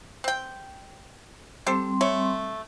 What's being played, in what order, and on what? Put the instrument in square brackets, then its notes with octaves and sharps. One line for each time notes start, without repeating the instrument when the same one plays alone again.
[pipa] C4 G5
[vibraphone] G3 C4 C6 [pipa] G4 A4 C5
[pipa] A3 C#5